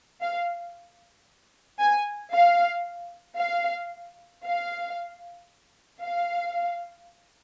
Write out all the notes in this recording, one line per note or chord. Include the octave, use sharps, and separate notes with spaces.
F5
G#5
F5
F5
F5
F5